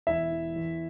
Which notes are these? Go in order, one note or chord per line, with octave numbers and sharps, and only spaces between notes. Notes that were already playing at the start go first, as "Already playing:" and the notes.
E1 E4 E5
E3
E2